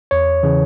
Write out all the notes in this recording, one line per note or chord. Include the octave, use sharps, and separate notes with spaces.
E2 C#5
C#3 E3